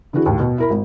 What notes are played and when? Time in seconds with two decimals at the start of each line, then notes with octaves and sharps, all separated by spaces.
0.13 D3 E3 E4 F#4 G#4
0.26 D#2 A2
0.40 B2
0.58 E4 A#4 B5
0.70 G#1